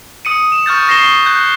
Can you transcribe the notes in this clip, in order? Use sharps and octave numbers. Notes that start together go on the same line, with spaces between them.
D#6 C#7 D#7
E7
C#6 F6 G6 A6
C#6 A#6 C7 E7 G7
F#6 G6